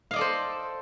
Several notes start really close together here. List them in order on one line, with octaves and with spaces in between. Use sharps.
F5 D#5 D5 A4 C5